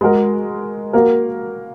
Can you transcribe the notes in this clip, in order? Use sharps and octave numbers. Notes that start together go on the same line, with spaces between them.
G#3 F#4 A#4
A#3 F#4 A#4